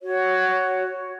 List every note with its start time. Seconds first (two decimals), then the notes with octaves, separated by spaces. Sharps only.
0.02 F#4 C#5